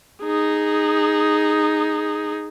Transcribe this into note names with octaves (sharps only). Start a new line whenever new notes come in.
D#4 G#4